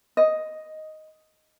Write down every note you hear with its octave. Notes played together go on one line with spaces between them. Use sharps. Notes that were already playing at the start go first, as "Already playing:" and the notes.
D#5